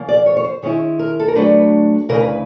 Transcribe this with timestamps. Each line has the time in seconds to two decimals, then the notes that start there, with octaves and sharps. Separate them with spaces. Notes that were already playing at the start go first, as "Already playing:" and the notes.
Already playing: E2 C#3 F3 A#3
0.09 D5
0.26 C#5
0.37 C#5
0.44 C5
0.62 D#3 G#3 C#4 E4 C#5
0.99 A#4
1.20 A4
1.28 A#4
1.35 D2 D3 F#3 A3 D4 B4
2.09 D2 C#3 E3 A#4
2.20 B4